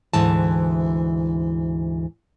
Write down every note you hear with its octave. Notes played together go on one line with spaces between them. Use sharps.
D2 G#2 E3 A5